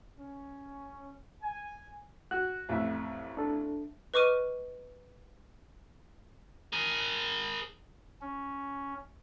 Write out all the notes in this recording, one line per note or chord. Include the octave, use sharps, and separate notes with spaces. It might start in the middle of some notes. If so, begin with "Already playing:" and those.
C#4
G#5
F#4 F#6
A1 F2 E5
D4 A4
B4 D#5 C#6 D6 F6 D#7
G#4 A#4
C#4